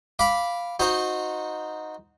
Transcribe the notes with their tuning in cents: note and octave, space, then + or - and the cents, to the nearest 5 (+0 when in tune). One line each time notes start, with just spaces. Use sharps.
F5 +0 B5 -5 D6 -10
D#4 +0 F#4 -20 C5 +0